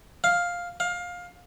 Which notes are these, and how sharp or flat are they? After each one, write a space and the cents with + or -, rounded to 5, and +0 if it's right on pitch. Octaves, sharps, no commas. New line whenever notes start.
F5 +5
F5 +20